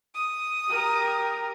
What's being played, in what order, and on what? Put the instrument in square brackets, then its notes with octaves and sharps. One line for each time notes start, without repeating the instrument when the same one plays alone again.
[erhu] D#6
[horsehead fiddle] G4 A#4